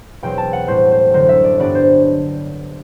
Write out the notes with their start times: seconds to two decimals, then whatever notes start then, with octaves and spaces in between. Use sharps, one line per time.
0.22 E2 B2 F#3 C4 G5
0.38 A5
0.53 F#5
0.67 A2 G3 C4 C5
0.92 C5
1.13 F#2 D3 F#3 C5
1.29 E5
1.44 D5
1.59 G2 F#3 B3 D4 D5
1.75 C5